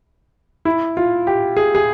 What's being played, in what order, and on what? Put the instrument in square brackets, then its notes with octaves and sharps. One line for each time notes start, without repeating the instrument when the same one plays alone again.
[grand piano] E4
F4
G4
G#4
G#4